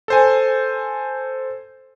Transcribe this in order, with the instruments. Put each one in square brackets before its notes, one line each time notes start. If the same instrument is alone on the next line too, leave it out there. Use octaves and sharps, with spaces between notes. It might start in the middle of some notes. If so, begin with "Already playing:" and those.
[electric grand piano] A4 C5 G#5